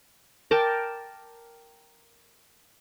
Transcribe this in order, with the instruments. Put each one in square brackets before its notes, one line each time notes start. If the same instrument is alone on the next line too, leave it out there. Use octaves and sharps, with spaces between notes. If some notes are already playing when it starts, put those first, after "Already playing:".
[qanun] A#4 G5 A5 D6